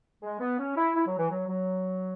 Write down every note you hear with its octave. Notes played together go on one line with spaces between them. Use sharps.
G#3
B3
C#4
E4
E4
F#3
E3
F#3
F#3